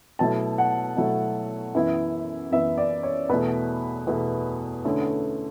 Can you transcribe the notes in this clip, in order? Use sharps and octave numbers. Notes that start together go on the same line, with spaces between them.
B2 F#3 A3 E4 A5
F#5
B2 F#3 A3 E4
F#2 E3 B3 E4
F#2 E3 B3 E4 E5
D5
C#5
E2 B2 A3 E4 B4
E2 B2 A3 E4
D3 A3 C#4 E4